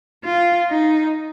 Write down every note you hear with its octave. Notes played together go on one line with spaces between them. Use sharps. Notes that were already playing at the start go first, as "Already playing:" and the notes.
F4
D#4